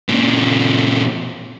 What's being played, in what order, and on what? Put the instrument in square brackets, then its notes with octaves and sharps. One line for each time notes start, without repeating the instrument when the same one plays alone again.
[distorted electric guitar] A#2 C#3